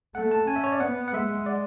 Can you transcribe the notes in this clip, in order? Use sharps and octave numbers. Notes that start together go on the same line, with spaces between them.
A3 F#5
A5
C#4 G#5
E5
C#5
D5
B3 F#5
F#5
G#3 E5
D5